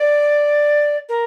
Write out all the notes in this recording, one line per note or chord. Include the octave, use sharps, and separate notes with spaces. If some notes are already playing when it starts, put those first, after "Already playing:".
Already playing: D5
A#4